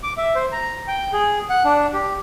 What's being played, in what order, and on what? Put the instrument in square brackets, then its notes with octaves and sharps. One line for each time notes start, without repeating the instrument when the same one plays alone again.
[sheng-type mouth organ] D6
E5
C5
A#5
G5
G#4
F#5
D4
G4